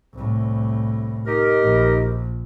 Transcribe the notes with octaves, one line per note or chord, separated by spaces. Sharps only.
C2 A2
D#4 G4 A#4
A#1